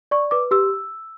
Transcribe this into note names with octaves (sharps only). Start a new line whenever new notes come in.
D5 C#6
B4 D6
G4 E6